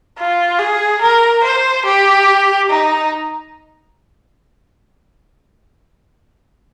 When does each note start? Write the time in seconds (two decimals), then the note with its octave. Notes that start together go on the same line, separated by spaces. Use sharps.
0.18 F4
0.59 G#4
1.01 A#4
1.44 C5
1.85 G4
2.69 D#4